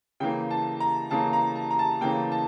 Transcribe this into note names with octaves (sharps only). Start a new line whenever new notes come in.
C#3 E3 A#3 G5
A5
A#5
C#3 E3 A#3 A5
A#5
A5
A#5
A5
C#3 E3 A#3 G5
A5